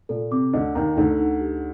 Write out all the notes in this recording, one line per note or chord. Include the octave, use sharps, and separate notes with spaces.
A#2 A4
C3 D6
D2 D3 D#5
D#2 D#3 A#5
D2 D3 D#4
D#4
G4